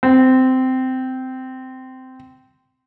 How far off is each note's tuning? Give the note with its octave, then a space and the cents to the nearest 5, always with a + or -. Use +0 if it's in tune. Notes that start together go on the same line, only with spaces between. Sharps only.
C4 -15